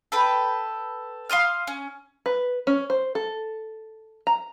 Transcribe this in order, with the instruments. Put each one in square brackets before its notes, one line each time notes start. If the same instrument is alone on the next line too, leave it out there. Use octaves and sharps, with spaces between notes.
[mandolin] A4 B4 G5
F5 C6 D#6 F6
C#4
[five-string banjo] B4
C#4
C5
A4
A#5